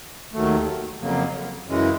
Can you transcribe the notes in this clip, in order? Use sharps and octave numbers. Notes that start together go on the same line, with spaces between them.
D#2 D#3 F#3 A3
F2 C#3 F#3 A#3
F#2 C#3 E3 G#3